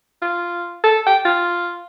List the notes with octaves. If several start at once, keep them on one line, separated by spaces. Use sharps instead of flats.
F4
A4
G5
F4